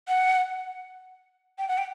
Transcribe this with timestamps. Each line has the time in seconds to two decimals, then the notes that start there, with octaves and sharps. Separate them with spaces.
0.08 F#5
1.58 G5
1.68 F#5
1.78 G5